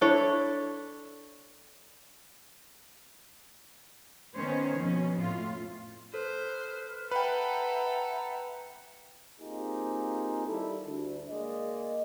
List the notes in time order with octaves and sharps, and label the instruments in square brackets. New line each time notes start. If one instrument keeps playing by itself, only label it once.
[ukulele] D4 E4 A4 C#5
[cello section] D#3 B3 C#4 C5 C#5
F2 B2 C#4
A2 F4
[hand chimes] A4 [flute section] B4 F6 F#6 [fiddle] C5
[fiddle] A4 [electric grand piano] B4 G5 [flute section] E5 F#5 A#5 [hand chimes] B5
[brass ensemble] A#3 C4 D#4 F4 G4 G#4
D#3 G3 E4 A4
D2
G#3 A#3 D5 D#5